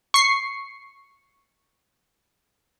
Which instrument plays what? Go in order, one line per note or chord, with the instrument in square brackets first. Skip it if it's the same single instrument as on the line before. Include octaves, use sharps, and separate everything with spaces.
[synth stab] C#6 C7